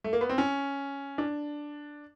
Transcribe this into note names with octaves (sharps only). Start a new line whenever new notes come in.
A3
A#3
B3
C4
C#4
D4